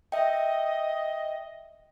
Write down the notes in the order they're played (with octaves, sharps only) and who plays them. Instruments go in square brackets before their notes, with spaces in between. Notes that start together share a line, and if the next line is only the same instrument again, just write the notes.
[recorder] D#5 [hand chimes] E5 G5